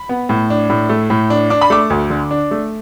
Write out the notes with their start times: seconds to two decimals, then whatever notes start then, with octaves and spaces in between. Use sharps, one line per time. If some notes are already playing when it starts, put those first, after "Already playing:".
Already playing: B5
0.09 B3
0.29 A2
0.50 D4
0.70 A2
0.89 A3
1.10 A2
1.30 D4
1.50 D4 D6
1.61 B5
1.70 A3 D6
1.90 D2
2.10 D3
2.31 D4
2.51 A3